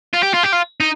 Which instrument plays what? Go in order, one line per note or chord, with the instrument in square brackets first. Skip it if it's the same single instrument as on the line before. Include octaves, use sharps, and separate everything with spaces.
[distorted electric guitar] F4
G4
F4
G4
F4
D#4